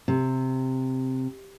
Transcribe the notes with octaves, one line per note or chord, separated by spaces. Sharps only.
C3